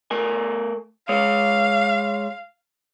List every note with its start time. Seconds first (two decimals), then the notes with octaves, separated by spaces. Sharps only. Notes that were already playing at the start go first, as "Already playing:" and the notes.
0.11 A3 A#4 G#5
1.09 G#3 C#5 F5